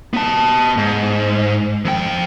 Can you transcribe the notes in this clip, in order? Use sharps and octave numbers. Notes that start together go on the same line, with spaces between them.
B3 A5
G#2
F2 G5